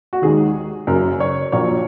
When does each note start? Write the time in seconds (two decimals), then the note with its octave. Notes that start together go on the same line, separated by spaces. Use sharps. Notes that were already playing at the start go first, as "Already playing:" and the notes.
0.13 F#4
0.22 D#2 D#3 G#3 G#4
0.87 F#1 F#2 C#3 A#4
1.20 C#5
1.52 A#1 A#2 F#3 A#3 C#5